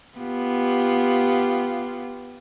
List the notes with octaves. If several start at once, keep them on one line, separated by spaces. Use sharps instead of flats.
B3 F4 G4